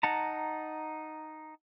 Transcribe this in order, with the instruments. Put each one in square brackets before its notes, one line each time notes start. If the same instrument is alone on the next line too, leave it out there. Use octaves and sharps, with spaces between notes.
[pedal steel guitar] D#4 F#5 A5 A#5